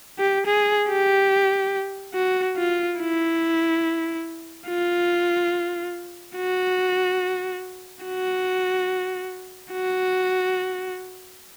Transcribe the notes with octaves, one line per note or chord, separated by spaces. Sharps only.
G4
G#4
G4
F#4
F4
E4
F4
F#4
F#4
F#4